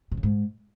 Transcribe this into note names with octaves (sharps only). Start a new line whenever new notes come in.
B2
C#3
G#2